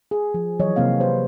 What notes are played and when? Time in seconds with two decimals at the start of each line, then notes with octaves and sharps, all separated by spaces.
0.11 G#4
0.34 F3
0.59 E3 F#3 C#5 D#5
0.76 C3 A#3 C4 F5
1.00 G4 B4 C5